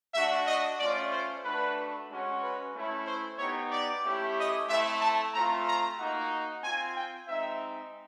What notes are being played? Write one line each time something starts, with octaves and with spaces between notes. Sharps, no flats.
A3 D4 F#4 E5
D#5
A3 C#4 F4 D5
C5
A3 D4 F#4 B4
G#3 C#4 F#4
B4
A3 C#4 E4
C5
B3 D#4 G4 C#5
D5
A3 C#4 E4 G4
D#5
A3 C4 E4 E5
A5
A3 C4 F4 A#5
A#5
A#3 D#4 F#4
C4 F4 G#5
G5
G#3 C4 D#4 E5